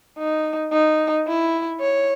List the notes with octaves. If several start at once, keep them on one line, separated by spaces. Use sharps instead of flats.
D#4
D#4
E4
C#5